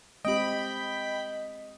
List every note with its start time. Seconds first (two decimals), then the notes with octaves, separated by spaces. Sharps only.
0.25 G#3 C4 G4 D#5 G5 B5